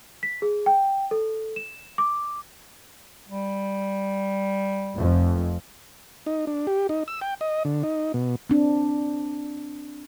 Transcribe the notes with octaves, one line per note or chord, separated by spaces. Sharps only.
B6
G#4
G5
A4
E7
D6
G3
F1 F2
D#4
D4
G4
D#4
E6
G5
D#5
D3
D#4
B2
C4 D4